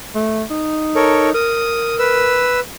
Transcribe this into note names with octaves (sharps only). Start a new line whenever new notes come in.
A3
D#4
A4 A#4 C#5
A#4 D#6
B4 E6